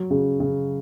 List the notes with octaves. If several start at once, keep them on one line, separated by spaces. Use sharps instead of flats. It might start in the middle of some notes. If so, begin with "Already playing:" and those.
Already playing: F#3
C#3
C#3